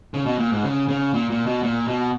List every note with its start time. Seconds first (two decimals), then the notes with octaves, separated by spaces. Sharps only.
0.14 C#3
0.26 B2
0.38 A#2
0.52 G#2
0.63 C#3
0.88 C#3
1.14 A#2
1.30 A#2
1.46 B2
1.63 A#2
1.88 B2